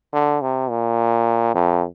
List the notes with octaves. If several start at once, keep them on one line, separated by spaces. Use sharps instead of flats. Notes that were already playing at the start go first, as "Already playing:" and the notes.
D3
C3
A#2
F2